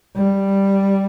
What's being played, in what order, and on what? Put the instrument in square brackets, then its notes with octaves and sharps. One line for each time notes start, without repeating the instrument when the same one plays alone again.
[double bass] G3